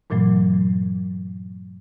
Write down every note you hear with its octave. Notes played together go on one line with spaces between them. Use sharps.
G2 A#2 E3 F#3 A3